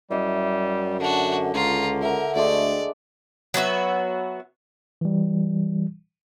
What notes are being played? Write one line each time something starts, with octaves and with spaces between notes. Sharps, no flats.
F#2 G3 E4 D#5
D3 D4 F#4
C#2 F4 A#5
A#4 E5 F#5
D2 G#3 A3 D4 D5
F#3 B3 F#4 E5
E3 G3